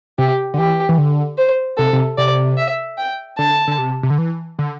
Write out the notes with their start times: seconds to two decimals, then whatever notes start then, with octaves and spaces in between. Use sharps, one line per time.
0.18 C3 G4
0.54 D3
0.58 E3 G4
0.89 E3
0.98 D3
1.38 C5
1.77 C3 A4
1.93 C3
2.18 C3 D5
2.57 E5
2.98 G5
3.38 D3 A5
3.67 D3
3.78 C3
4.03 C3
4.10 D3
4.18 E3
4.59 D3